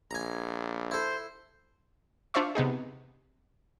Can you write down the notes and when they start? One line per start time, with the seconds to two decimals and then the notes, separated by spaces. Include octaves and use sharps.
0.11 A#1 G#5 A#5
0.91 E4 A4 C5
2.34 D4 F4 C5 D5 E5 C#6
2.55 C3 B3 D#4 G#4